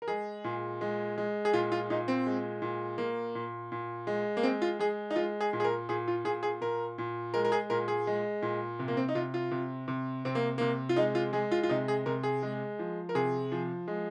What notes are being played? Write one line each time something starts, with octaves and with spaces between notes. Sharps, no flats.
A#4
G#3 G#4
A#2
G#3
G#3
G#4
A#2 F4
F4
A#2 D#4
C4
G#3
A#2
A#2 A#3
A#2
A#2
G#3
A#3
G#3 C4
F4
G#3 G#4
D#4
G#3 F4
G#4
A#2
G#4
A#4
A#2 G#4
F4
A#2 G#4
G#4
A#2 A#4
A#2
G#3 A#4
A#4
G#4
A#2 A#4
G#4
G#3
A#2
C3
A#3
C4
D#4
C3 F4
F4
C3
C3
C3 C4
A#3
C3 A#3
F4
G#3 D#4
F4
G#3 G#4
F4
F4
C3 D#4
G#4
C3 A#4
G#4
G#3
F3
A#4
C3 G#4
F3
G#3